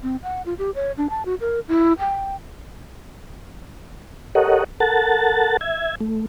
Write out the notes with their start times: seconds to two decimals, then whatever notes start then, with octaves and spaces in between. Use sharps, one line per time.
0.03 C4
0.23 F#5
0.46 F4
0.58 G4
0.75 C#5
0.97 D4
1.10 A5
1.25 F#4
1.40 A#4
1.68 E4
1.99 G5
4.35 G4 A4 A#4 C#5 D#5 F#5
4.80 A4 A#4 F#5 A5 A6
5.61 E5 G#6
6.01 A3